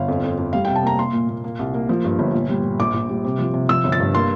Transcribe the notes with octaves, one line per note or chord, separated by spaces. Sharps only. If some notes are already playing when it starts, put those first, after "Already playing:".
Already playing: G1 F5
F2
F2
F2
G3 F5
G5
C3
A5
A#3 A#5
A#3 C6
A#2
A#2
A#3
C2
A#3
F3
G2
G1
A#2
G3
A#2
A#1 D6
A#1
G3
C3
F3
C3
F3 E6
G1
A6
G2
A#3 C6